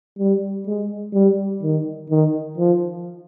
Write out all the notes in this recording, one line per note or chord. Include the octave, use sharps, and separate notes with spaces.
G3
G#3
G3
D#3
D#3
F3